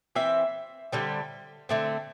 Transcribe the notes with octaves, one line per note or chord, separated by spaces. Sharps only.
E3 C4 E5
D3 G3 C4
D3 A3 C4